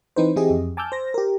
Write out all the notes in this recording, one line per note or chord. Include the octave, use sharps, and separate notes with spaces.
E3 C4 D#4 B4 C5
E3 C4 E4 G4 G#4 D#5
F2
G#5 A5 D6 E6 F6 G6
C5 A#6
G4 A#4